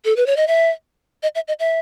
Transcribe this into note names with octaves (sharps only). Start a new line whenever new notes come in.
A4
B4
C#5
D#5
E5
D#5
E5
D#5
E5